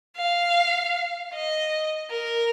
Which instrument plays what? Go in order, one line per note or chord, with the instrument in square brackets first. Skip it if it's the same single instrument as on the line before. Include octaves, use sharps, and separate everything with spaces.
[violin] F5
D#5
A#4